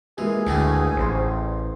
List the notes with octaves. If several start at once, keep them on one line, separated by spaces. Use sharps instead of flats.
E3 G#3 A#3 G#4
D2 A2 C#3 E3
A1 C5 C6